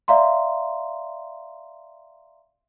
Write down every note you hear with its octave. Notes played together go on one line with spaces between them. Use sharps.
D5 E5 F5 A#5 C6